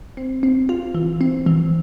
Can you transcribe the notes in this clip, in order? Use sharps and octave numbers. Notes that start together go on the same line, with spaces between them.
C4
C4
F4
E3
C4
E3